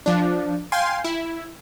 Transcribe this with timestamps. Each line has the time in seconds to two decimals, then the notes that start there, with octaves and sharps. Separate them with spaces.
0.06 F3 D4
0.72 F5 G5 G#5 C6
1.04 E4